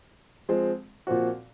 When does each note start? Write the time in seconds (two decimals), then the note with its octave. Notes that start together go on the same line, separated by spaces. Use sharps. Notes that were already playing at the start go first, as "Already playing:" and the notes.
0.49 F3 G#3 C4
1.07 A#2 F3 C4 F#4